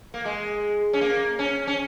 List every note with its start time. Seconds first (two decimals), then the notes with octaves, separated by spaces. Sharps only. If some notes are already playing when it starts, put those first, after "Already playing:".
0.14 A#3
0.25 G#3
0.93 C#4
1.01 A#3
1.39 C#4
1.67 C#4